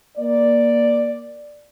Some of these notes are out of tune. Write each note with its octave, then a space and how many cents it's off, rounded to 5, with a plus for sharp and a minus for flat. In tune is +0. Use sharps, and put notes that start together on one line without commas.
A#3 +15 D5 +0